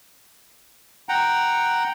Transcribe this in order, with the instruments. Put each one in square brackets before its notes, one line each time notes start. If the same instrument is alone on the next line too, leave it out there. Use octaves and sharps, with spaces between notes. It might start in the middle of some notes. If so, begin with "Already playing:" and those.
[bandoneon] F#5 G5 A#5